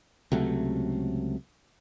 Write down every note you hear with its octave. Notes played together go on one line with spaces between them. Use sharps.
C#2 C3 F#3 A3